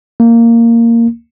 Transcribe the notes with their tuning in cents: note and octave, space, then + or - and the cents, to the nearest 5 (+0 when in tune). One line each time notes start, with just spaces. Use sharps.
A#3 -10